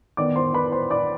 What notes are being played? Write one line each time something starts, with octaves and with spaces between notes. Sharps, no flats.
D#3 B3 D5 D6
C5 C6
B4 B5
C5 C6
D5 D6